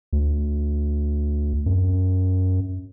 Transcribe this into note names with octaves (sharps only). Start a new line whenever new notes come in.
D2
F#2